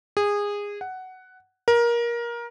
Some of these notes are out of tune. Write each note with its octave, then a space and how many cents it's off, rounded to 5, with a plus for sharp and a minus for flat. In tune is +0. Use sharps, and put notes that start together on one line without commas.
G#4 -20
F#5 +10
A#4 +20